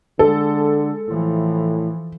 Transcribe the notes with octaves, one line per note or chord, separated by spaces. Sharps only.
D3 G#3 A4
A2 E3 F3